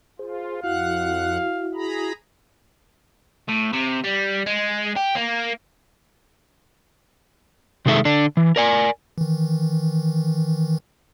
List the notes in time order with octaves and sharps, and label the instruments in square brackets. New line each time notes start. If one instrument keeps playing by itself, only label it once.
[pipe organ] F4 [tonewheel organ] G#4 C5
[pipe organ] F2 F#5 F#6 [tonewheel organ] E4 F#4 [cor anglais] F5
[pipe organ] G#4 A#5 B5
[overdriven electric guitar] A2
C3
G3
G#3
G4
A#3
[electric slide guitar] C3 D#3 G#3 A4 E5
D3 D4
E3
A#4 D5 G#5
[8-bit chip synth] D#3 E3